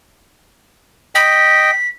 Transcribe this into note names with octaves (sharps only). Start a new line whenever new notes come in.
D#5 G5 B6